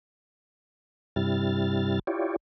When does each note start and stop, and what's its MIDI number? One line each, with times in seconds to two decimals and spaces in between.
1.16 1.99 43
1.16 1.99 48
1.16 1.99 55
1.16 1.99 64
1.16 1.99 89
1.16 1.99 93
2.07 2.36 64
2.07 2.36 65
2.07 2.36 67
2.07 2.36 73
2.07 2.36 74